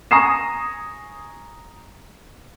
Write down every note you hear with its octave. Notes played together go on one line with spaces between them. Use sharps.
G#5 A#5 C#6 D#6 C7 E7